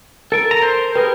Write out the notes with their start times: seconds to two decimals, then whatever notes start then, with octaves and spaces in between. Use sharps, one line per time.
0.32 A4 A#4
0.51 A#5
0.62 C5
0.95 G4 G#4 A#4 B4